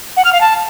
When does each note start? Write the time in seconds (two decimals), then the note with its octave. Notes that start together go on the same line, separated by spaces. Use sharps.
0.17 F#5
0.25 F6
0.33 F5
0.41 A5